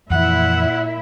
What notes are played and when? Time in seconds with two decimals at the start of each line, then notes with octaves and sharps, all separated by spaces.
0.10 F2 A#2 E3 E4 E5 F#5